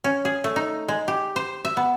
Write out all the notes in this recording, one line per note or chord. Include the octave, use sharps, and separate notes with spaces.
C#4
G#4
A3
D#4
G#3
G4
C5
E5
B3